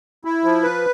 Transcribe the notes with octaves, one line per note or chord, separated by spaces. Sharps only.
E4
F3
B4